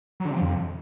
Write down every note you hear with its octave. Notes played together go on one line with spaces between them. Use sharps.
F#3
D3
C3
F3
F2